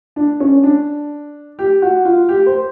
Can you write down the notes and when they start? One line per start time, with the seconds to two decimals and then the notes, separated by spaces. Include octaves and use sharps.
0.16 D4
0.40 C#4
0.64 D4
1.59 G4
1.82 F#4
2.05 F4
2.29 G4
2.46 C5